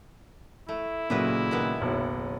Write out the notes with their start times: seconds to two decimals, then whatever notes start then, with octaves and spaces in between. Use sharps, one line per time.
0.69 A3 E4
1.10 A#2 C#3 F#3 A3 B4 D#5
1.51 D#3 G#3 B3
1.81 F#1 B1